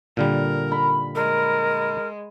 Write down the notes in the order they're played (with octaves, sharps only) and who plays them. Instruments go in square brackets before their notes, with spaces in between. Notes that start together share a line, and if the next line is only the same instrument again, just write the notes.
[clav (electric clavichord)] A#2 D3 G3 [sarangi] A#4
[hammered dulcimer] B5
[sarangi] G#3 [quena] A#4